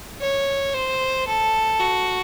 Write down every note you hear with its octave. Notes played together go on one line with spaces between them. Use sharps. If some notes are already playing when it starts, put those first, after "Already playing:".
C#5
C5
A4
F#4